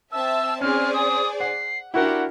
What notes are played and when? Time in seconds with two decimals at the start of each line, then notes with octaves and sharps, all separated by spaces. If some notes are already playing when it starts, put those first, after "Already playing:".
0.12 C4 E5 A5 E6
0.61 C4 C#4 G#4 C5 D5 F6
0.94 D#6
1.40 F#5 C7
1.94 D4 E4 F#4 G4 A#4 F#5